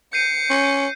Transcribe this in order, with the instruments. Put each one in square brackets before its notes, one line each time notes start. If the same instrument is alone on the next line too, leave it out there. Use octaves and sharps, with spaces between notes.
[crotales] G6 C7 D#7 [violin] C#7
[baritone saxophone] C#4